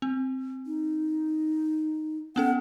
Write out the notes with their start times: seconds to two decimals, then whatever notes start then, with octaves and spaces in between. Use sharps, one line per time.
0.02 C4
0.67 D#4
2.36 B3 C#4 A4 F#5